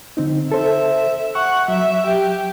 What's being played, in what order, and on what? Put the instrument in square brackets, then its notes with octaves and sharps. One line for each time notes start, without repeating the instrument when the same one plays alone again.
[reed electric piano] D3 C4 D#4
[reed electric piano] A4 C5 [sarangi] E5
[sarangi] F#5 [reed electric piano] C#6
[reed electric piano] F#3 [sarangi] E5
[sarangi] G4